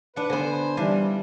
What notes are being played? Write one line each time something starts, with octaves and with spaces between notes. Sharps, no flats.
D4 B4 F#5
D3 B3 C5 G#5
E3 G3 D4 F5